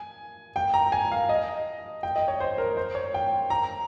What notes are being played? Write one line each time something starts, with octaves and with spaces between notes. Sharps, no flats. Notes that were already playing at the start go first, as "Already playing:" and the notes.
Already playing: G#5
G5
A#5
G#5
F5
D#5
G5
D#5
C#5
C5
A#4
C5
C#5
G5
A#5